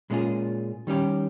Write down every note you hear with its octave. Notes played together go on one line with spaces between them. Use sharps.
A#2 G#3 C#4 F4 G#4
D#3 G3 C#4 G4